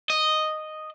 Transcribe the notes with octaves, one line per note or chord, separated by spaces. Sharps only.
D#5